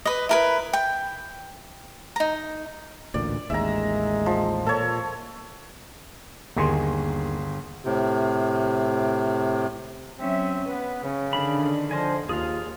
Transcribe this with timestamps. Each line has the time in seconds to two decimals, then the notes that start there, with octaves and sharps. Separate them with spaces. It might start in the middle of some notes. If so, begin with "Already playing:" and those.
0.05 B4 D#5
0.29 E4 A#4 B4
0.73 G5
2.16 D#4 A#5
3.14 A1 D2 A#2 D5
3.50 A1 D#2 G#3 E5 A#5
4.26 F3
4.66 A#2 A4 C#5
6.57 G1 D#2 D#3 G#4 C6
7.85 A2 C3
10.18 F#3 C4 C#4 E5
10.68 B3 B4
11.03 C#3 C#4
11.33 D3 D#3 D4 B5
11.91 F3 C5 D#5 G#5
12.29 D#2 F4 G#4 F5